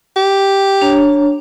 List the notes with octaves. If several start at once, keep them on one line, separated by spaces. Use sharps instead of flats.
G4
D4 C#5 A#5